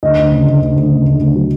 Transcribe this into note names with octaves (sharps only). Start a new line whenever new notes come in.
D2 D#5
D2
C#3
D2
D2
D2
C#3
D2
D2
F#3